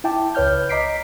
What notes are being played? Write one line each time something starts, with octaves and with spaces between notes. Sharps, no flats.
E4 E5 G5 A5 D6
C#2 B4 C#5 F6 G6
D#5 A#5 D6 B6 C7 D7